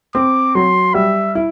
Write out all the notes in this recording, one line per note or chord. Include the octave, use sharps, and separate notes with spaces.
C4 D6
F#3 C6
G3 E5
E4